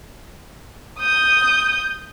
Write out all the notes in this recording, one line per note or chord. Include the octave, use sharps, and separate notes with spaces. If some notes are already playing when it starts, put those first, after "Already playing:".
D#6 G6